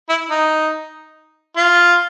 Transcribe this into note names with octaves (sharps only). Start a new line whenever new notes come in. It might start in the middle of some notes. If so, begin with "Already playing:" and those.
E4
D#4
F4